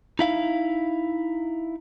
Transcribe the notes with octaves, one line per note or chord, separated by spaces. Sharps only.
D#4 E4 F5